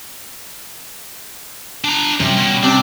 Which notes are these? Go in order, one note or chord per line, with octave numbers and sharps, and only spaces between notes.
D4 A#5
C3 G3 C#4
B2
C3 D4